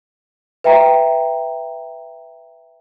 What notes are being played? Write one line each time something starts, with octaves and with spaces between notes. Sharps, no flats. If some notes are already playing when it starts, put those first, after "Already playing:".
B4 E5 G5 A#5